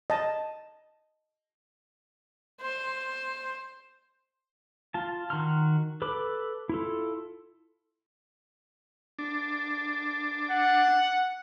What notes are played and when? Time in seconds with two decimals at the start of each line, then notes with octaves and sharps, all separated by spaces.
0.10 D#5 A5
2.61 C5
4.94 F4 A5
5.30 D#3 F#4 A#5 C6 F6
6.02 A4 B4 B5 D6
6.69 E4 F4 A4
9.19 D4
10.51 F#5